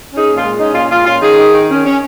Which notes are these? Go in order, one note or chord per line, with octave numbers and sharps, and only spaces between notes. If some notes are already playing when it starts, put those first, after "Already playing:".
C#4
D#4 G#4
A#2
F4
G#3
C#4 D#4
A#2 F4
A#2 F4
C#4 F4
D#3 D#4 G#4
D#3
D#3
C#4
C#4